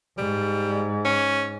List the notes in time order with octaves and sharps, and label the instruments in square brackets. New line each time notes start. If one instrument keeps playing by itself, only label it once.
[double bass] G#2 [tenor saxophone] G3
[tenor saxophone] C#4